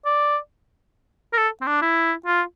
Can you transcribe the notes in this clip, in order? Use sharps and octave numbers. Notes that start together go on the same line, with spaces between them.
D5
A#4
A4
C4
D4
E4
F4